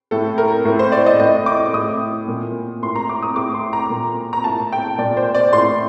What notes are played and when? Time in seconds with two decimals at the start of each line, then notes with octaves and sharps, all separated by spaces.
0.11 A2 A4
0.38 A#4
0.65 A2
0.79 C5
0.92 D5
1.06 D#5
1.20 A2 D#5
1.46 D6
1.73 A2 D#6
2.28 A#2
2.83 A2 C6
2.96 A#5
3.09 D6
3.22 D#6
3.36 A2 D6
3.54 C6
3.73 A#5
3.90 A#2
4.33 A#5
4.44 A2 A5
4.72 G5
4.98 A#2 D5
5.17 C5
5.35 D5
5.53 A2 C6